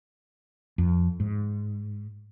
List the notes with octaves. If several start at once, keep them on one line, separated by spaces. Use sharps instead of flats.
F2
G#2